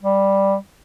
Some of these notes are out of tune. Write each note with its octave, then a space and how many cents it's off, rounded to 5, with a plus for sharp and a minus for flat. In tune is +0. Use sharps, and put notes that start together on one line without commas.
G3 +0